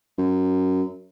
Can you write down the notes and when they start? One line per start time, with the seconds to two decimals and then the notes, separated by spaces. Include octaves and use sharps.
0.18 F#2